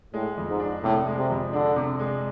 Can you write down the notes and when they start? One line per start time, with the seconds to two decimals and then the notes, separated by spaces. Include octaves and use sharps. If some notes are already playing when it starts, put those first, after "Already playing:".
0.13 A2 G#3
0.37 F2
0.49 G#2
0.60 D4
0.83 A2 C3
1.06 G#3
1.18 C3
1.30 F2
1.53 D3 D4
1.76 C3
1.99 G#3